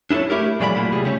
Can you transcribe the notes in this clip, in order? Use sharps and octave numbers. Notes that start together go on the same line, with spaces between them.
D4 E4 G#4 A4 C#5
A3 E4 G4 A#4
A#2 F#3 G#3 D5 E5 B5
F#3 A3 A#3 E4 F4 A4
D#2 A2 C3 G3 G#4
C#3 G3 A3 C4 C#4